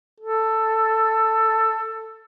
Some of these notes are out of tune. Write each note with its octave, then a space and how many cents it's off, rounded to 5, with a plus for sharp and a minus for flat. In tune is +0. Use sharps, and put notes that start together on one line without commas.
A4 +10